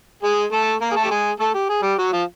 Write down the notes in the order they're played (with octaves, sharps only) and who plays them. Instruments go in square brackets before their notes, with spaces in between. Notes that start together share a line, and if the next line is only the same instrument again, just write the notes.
[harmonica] G#3 G#4
A3 A4
A#3 A#4
G#4
A3 A4
G4
G#3 G#4
A3 A4
G4
G#4
G3 G4
F#3 F#4
F3 F4